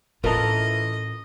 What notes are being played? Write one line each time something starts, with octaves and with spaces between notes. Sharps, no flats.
A2 E3 C#4 F4 A4 A#4 D#5